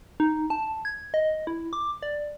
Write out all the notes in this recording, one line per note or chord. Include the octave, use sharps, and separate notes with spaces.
D#4
A5
G#6
D#5
E4
D6
D5